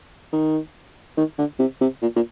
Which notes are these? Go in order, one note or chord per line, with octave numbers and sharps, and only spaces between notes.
D#3
D#3
D3
C3
C3
A#2
A#2